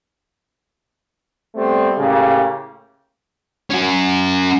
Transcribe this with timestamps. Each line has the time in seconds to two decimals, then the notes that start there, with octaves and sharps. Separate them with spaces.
1.56 G3 A3 B3 C4
1.96 A2 C#3 A#3 G4
3.70 C#4 F#4